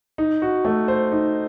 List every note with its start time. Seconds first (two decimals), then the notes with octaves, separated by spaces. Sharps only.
0.18 D#4
0.42 F#4
0.65 A3
0.88 C5
1.12 D#4